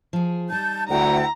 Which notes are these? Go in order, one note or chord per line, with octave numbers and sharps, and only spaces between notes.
F3 G#4
G3 D#4 A5 G6
D2 E4 F#5 G5 A#5